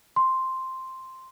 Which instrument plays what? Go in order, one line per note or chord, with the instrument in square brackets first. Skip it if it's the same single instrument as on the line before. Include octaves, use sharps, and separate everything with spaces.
[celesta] C6